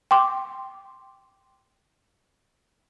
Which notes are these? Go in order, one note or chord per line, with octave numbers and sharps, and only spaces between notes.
G5 C6 D6